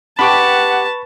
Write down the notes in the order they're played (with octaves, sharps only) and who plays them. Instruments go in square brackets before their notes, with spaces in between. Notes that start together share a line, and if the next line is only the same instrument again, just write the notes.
[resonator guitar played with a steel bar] D4 G4 G5 [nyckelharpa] B4 A5 [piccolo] F#5 [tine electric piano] B5 C#6